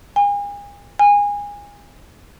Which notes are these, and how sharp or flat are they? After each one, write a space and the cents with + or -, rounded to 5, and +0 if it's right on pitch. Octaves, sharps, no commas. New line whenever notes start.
G#5 -40
G#5 -25